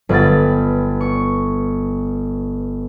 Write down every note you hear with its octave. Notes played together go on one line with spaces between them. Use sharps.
G1 B4 B5 F#6 A6
C#6